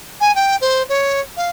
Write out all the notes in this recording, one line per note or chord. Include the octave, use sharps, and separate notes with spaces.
G#5
G5
C5
C#5
F5